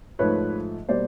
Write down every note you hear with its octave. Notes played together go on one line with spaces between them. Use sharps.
G#2 F3 A3 B4 C#5
B2 G3 A#3 C5 D5